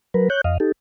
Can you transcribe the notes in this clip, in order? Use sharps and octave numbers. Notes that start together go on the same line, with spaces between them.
F#3 A#4 B4
C#5 F#6 G6
F2 D#5 F5
D#4 G4 A4